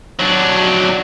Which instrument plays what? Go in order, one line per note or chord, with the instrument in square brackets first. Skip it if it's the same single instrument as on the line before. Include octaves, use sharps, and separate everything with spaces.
[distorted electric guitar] F#3 D4